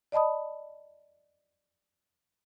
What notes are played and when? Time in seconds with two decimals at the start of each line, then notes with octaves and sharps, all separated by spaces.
0.12 D5 D#5 A5 B5 D#6